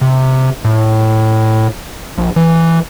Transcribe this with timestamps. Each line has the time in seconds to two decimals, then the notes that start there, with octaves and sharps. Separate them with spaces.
0.01 C3
0.65 A2
2.18 A#1
2.36 E3